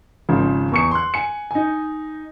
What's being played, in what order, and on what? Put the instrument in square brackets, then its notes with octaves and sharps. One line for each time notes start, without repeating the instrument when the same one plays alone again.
[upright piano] G#1 C#3 F3
E2 C#6 C#7
C6 F#6
G#5 C#7
D#4 G#5